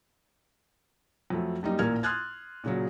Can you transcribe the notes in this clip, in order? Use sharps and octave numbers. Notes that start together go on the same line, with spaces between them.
F2 F#3 A3
F#2 G3 A#3 D#4
A1 A#2 A#3 A#4 F6 G#6
C6 D#6 F6 F#6 G#6 A6
A#2 C#3 F#3